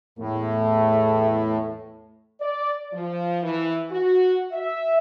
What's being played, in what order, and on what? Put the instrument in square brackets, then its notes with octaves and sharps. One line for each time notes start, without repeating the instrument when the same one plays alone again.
[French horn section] E2 A3 [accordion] A2
[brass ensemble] D5
F3
E3
F#4
E5